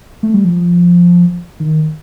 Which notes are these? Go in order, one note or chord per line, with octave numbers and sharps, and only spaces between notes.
A3
G3
F3
D#3